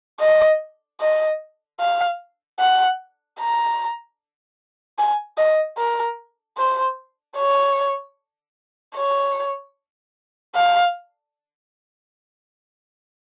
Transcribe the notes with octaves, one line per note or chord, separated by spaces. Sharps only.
D#5
D#5
F5
F#5
A#5
G#5
D#5
A#4
C5
C#5
C#5
F5